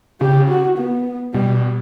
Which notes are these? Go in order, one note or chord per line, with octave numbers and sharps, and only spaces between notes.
C#3 G4
F#4
B3
B2 G3